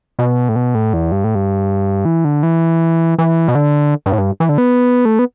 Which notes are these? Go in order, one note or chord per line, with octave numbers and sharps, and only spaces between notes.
B2
A2
B2
A2
E2
G2
A2
G2
E3
D3
E3
E3
B2
D3
G2
A2
G2
E3
D3
B3
A3
B3